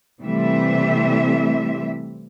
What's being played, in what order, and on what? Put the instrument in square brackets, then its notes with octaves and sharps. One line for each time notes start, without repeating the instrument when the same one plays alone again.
[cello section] C3 E3 G3 A3 C4 E5